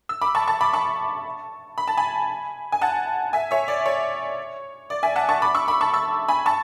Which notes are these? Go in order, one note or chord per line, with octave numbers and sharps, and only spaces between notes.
E6
B5 D6
A5 C#6
A5 C#6
B5 D6
A5 C#6
B5
A5
G#5 B5
G#5
F#5 A5
E5 G#5
C#5 E5
D5
C#5
D5
E5 G#5
F#5 A5
A5 C#6
B5 D6
C#6 E6
B5 D6
A5 C#6
C#6 E6
G#5 B5
A5 C#6